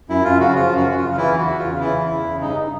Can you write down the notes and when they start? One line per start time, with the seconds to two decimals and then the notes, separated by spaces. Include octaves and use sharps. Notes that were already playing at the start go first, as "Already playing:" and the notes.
0.09 F#2 E4
0.24 F#2 F4
0.40 C#3 F#4
0.56 F3 F4
0.72 F#2
0.77 F#4
0.87 F#2
0.98 C#3 F4
1.17 E3 E4
1.34 E2 F#4
1.49 E2
1.59 F4
1.64 C#3
1.80 E3 E4
1.95 E2
2.12 E2
2.27 C#3
2.42 G2 D#4